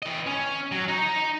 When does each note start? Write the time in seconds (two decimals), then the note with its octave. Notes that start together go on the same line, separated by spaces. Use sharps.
0.02 E3 D#5
0.27 C#4
0.72 F#3
0.88 D#4